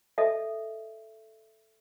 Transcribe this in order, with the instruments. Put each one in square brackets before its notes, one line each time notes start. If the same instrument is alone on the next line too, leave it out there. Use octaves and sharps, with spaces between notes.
[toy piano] A4 D#5 E5